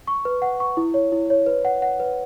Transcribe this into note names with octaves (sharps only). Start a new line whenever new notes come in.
C#6
B4
F#5
C#6
E4
C#5
E4
C#5
B4
F#5
F#5
B4